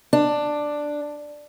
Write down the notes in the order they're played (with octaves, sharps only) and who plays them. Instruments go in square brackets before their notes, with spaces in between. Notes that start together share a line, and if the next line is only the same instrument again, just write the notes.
[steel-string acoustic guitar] D4